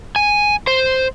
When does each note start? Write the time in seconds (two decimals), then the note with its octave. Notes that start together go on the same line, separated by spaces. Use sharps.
0.16 G#5
0.67 C5